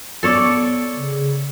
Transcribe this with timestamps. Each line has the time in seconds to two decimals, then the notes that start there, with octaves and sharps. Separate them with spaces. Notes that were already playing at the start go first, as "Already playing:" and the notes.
0.23 B3 A4 C#5 D5
0.96 C#3